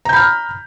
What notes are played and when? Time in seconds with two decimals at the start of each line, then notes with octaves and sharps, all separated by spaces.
0.05 A#5
0.09 G6
0.13 B5
0.16 F6